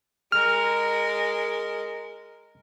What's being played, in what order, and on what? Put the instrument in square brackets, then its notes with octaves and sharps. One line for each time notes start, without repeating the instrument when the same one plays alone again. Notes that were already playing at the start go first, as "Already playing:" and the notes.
[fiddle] G#3 A#4 [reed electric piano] F6